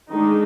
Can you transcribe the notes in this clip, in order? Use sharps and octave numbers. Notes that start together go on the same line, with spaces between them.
D#3 G#3 D4 D#4